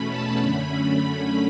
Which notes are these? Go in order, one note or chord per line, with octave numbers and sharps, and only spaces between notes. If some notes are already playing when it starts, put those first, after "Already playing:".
Already playing: E2 B2 A3 C#4 B5
A5
F#2 D3 A3 C#4 B5
B5